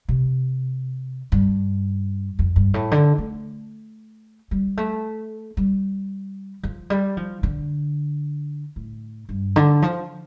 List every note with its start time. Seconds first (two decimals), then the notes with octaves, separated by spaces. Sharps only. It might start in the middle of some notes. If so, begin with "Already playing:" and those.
0.09 C3
1.32 G2
2.39 F2
2.56 G2
2.74 A2
2.91 D3
3.18 A3
4.51 G3
4.77 A3
5.57 G3
6.63 F3
6.90 G3
7.17 F3
7.43 D3
8.76 A2
9.29 G2
9.56 D3
9.82 F3